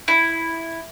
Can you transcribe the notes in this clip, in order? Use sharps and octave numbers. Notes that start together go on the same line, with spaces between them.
E4